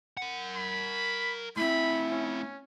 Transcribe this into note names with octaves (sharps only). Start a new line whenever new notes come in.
A#4 F#5
B5
A3 C4 E4 B5
C#4